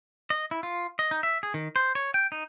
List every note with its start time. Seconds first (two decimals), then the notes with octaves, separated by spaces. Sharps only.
0.30 D#5
0.51 E4
0.63 F4
0.99 D#5
1.11 D#4
1.23 E5
1.43 G#4
1.54 D#3
1.76 C5
1.95 C#5
2.14 G5
2.32 D#4